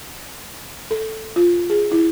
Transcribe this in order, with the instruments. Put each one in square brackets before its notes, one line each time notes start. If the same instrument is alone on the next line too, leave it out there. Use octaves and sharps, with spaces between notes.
[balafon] A4
F4
G#4
E4